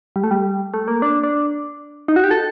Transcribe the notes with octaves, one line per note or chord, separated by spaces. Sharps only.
G3
A3
G3
A3
A#3
D4
D4
D#4
F#4
G4
A4